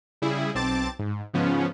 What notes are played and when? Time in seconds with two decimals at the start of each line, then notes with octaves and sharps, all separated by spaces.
0.22 C#3 G3 E4 G#4
0.55 B1 C4 A5 D6 A6
0.99 G#2
1.33 G#2 C#3 F3 B3 C#4